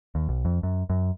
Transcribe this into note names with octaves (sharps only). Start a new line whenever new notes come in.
D#2
B1
F2
F#2
F#2